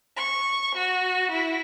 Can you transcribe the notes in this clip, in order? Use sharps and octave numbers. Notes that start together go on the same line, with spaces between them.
C#6
F#4
E4